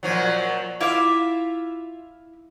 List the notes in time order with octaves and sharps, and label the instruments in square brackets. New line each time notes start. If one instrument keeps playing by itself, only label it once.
[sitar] A#2 F3 F#3
[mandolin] E4 F5 D6 [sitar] F4 E5